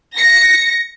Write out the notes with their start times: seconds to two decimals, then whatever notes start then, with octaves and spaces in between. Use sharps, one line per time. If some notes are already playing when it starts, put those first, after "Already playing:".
0.15 A#6 C#7